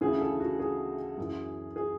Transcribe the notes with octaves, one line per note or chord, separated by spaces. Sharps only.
D2 C#3 E3 G#4
A4
F#4
G#4
F#2 E3
G#4